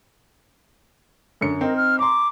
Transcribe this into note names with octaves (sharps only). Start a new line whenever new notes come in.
F#2 D3 C#7
C4 D#4 A#4
F6
A#5 C6 D6